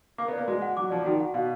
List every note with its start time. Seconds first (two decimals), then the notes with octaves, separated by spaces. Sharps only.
0.18 A#3 D6
0.28 B3
0.33 A#3 D5
0.48 G#3 F#4
0.62 F#5
0.77 F#3 D6
0.90 F3 D5
1.05 D#3 F#4
1.20 F#5
1.34 B2 F5